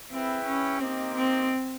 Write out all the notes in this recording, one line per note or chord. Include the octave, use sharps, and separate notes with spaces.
C4 E4 G#4 B4 E5 G5
C#4
A#3 C4 D#4 G4 C5 D#5
C4